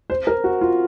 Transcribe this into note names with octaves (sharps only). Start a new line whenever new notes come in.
C5
A#4
F#4
F4